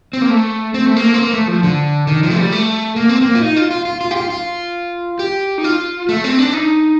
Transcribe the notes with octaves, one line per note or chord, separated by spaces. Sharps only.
C4
A#3
A3
C4
A3
A#3
C4
A#3
A3
F3
D3
D#3
F3
A3
G3
A3
A#3
C4
A#3
F4
D#4
F4
F4
F4
F4
G4
F4
F4
G4
D#4
F4
A3
C4
D4
D#4